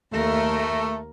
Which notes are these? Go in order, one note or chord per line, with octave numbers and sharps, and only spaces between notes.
D#2 A3 A#4